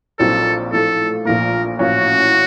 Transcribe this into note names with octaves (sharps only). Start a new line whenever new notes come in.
A#1 A#2 F#3 C4 D#4 A4
A2 F3 A3 A4
A#1 A#2 F3 A#3 A#4
A1 A2 F3 A#3 C#4 F#4